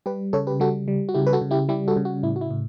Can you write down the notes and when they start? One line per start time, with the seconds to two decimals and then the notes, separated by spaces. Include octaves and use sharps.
0.06 G3 G4 B4
0.33 C#3 A4 C#5
0.47 G4 B4
0.60 G3 F#4 A4
0.88 G3
1.09 F#4
1.14 C#3 E4 G4
1.27 B4
1.33 F#4 A4
1.41 C#3
1.51 E4 G4
1.69 G3 E4 G4
1.88 F#4 A4
1.97 C#3
2.05 F#4
2.23 A2 E4
2.36 F#4
2.41 E4
2.51 A2